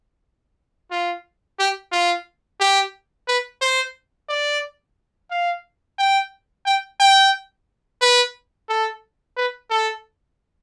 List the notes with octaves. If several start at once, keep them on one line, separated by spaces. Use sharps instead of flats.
F4
G4
F4
G4
B4
C5
D5
F5
G5
G5
G5
B4
A4
B4
A4